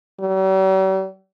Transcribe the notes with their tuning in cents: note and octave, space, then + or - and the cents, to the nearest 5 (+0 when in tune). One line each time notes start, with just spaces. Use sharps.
G3 -45